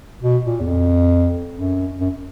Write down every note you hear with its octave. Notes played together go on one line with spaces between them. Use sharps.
B2
A#2
E2
F2
F#2
F#2